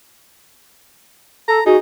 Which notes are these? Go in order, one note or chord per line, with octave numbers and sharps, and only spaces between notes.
A4 A#5
D#4 F#4 G#4